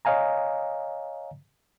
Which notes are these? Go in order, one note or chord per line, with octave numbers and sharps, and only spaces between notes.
C#5 D#5 F5 G#5 A#5